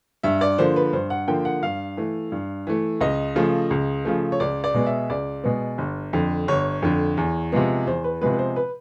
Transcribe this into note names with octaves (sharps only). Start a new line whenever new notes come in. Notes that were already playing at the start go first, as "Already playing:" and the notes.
G2 E5
D5
D3 F3 A#3 C5
B4
G2 C5
F#5
D3 F3 A#3 G5
F#5
G2 F5
E3 A3
G2
E3 A3
C#2 D#5
C#3 F3 A3
C#2
C#3 F3 A3
C#5
C#2 D5
D5
B2 G#3 B3
E5
C#2 D5
B2 G#3 B3
G1
F2 D3
G1 C#5
F2 D3
E2
C3 F3 G#3 B3
E2 C5
B4
C3 F3 G#3 B3 B4
B4
C5
B4